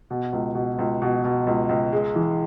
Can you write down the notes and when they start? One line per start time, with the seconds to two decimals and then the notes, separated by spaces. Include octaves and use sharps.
0.10 B2
0.33 C#2
0.55 B2
0.79 C#2
1.02 B2
1.24 B2
1.47 C#2
1.69 C#2
1.93 G#3
2.15 E3